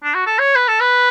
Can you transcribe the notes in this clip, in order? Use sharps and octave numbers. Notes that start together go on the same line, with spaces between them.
D4
F#4
A4
C#5
B4
A4
B4